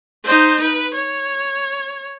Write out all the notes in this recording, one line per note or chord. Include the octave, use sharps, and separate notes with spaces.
D#4 C5
B4
C#5